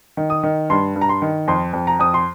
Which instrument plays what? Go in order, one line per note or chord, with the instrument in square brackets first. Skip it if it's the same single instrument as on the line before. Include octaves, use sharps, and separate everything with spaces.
[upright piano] D#3
D#6
D#3
G2 C6
G2
A#5
C6
D#3
F2 C6
F2
A#5
F2 D#6
C6